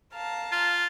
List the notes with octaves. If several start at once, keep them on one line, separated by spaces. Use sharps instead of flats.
F5 A5 A#5
F4